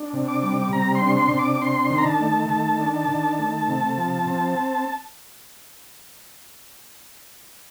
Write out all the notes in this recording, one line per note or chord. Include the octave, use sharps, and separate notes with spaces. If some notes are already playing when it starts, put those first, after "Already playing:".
Already playing: D4
C3
D6
G3
C3 A#5
C6
D4
C6
C3 C6
D6
D4 C6
D#3
A#5
A5
A3
D#3 A5
D4
A5
D#3
A3
C3
F3
C4